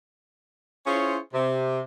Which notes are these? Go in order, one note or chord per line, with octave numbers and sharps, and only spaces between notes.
C#4 E4 F4 G#4 C5 C#5
C3